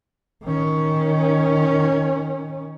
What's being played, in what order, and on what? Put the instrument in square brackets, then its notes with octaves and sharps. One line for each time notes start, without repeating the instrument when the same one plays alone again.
[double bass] D#3 C#4